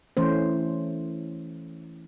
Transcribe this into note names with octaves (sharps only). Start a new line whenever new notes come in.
E3 A3 C#4 C5